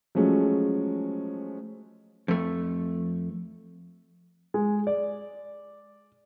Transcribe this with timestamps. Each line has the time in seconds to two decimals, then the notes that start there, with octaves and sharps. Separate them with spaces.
0.15 F3 F#3 G#3 A3 C#4
2.28 F2 A3
4.54 G#3
4.87 D5